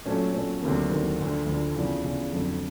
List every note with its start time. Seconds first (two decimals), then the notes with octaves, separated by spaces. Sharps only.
0.06 A#2 F#3 A3 C#4
0.34 A#2 F#3 A3 C#4
0.62 D2 C3 D#3 F#3 A#3
0.90 D2 C3 D#3 F#3 A#3
1.19 D2 D3 F3
1.46 D2 D3 F3
1.75 E2 C#3 F3
2.03 E2 C#3 F3
2.31 F2 D3 F#3 A3 C4